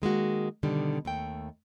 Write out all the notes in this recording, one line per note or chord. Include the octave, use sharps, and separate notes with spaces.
D#3 G#3 A#3 F#4
B2 D3 D#3 G3
D#2 A3 G5